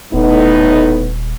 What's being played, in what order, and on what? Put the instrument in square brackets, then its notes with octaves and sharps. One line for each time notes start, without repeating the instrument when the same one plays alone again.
[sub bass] D#1 [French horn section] A2 B3 D#4